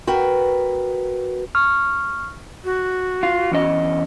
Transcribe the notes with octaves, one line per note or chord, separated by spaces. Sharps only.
F#4 A#4 B4 G5
C#6 F6
F#4
F4
E2 C#4 D#5